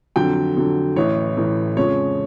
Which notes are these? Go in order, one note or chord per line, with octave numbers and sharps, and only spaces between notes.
F2 D3 F#3 G5
F2 D3 F#3
A1 A2 E3 C#5
A1 A2 E3
F2 C#3 F3 G#3 C#5